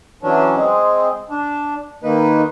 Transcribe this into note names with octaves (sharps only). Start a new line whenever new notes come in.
E3 F#3 C#4 D4
G#3 C4 G#4
D4
D#3 A#3 D#4 B4